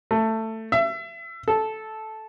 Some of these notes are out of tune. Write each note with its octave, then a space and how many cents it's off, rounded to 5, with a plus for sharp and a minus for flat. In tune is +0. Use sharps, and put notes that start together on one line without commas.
A3 +15
E5 +30
A4 -10